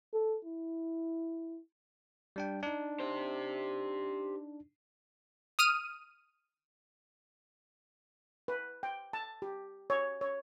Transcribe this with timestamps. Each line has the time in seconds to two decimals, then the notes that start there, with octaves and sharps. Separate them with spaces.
0.14 A4
0.45 E4
2.36 G3 D4 G5
2.63 D4 D#4
3.00 G4 C5
5.59 D#6 F6 D#7
8.48 B4
8.83 G5
9.13 A5
9.42 G4
9.90 C#5
10.21 C#5